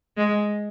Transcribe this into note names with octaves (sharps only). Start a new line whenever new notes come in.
G#3